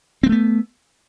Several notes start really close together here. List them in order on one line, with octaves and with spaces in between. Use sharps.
C4 G#3 A3 B3